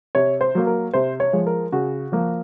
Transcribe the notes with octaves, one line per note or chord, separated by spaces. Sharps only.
C3 C#5
C5
F#3 A#3
A#4
C3 C5
C#5
F3 G#3
A#4
C#3 F#4
F3 A#3